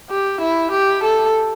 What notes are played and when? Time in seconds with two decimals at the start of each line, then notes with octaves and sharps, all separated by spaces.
0.10 G4
0.41 E4
0.72 G4
1.04 A4